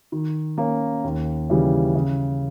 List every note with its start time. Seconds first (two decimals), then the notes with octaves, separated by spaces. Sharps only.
0.12 D#3
0.58 A#3 C#4
1.04 D#2
1.50 C#3 E3 G3
1.95 C#3